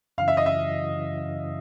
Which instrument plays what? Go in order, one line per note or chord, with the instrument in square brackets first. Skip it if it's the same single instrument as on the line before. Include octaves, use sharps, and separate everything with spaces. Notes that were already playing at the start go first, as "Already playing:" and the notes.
[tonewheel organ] F#2 C#3 E3 [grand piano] F5
[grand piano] E5
D#5
E5